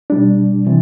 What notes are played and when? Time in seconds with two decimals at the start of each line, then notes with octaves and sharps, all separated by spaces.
0.10 B2 G3 D4
0.67 C3 E3